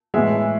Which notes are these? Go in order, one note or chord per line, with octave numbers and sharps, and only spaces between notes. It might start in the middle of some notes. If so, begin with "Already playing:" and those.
A2 E3 G#3 E5